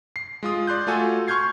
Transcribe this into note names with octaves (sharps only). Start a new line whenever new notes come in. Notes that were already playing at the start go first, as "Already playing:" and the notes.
C7
G#3 F4 D#6
D5 C6 F#6 G6
A3 F4 F#4 A4 G#5
C6 C#6 F6 G6 G#6 C7